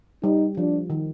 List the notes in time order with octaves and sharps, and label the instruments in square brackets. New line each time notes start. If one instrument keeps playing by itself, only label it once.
[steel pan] G3 [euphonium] D#4
[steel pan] F3 [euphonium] D4
[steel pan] D#3